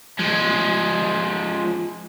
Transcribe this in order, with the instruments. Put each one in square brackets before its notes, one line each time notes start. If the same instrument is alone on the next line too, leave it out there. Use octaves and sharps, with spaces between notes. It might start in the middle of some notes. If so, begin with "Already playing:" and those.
[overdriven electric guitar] F3 G#3